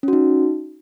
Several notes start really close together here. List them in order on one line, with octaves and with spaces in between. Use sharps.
C#4 F#4 D#4